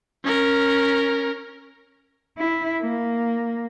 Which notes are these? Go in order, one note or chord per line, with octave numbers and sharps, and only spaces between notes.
C#4 A#4
E4
A#3